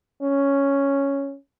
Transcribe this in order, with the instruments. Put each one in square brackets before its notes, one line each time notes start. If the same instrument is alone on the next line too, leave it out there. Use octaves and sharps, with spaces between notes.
[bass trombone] C#4